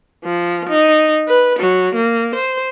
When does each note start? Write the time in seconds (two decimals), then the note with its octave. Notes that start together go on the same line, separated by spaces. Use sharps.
0.25 F3
0.69 D#4
1.28 B4
1.59 F#3
1.95 A#3
2.35 C5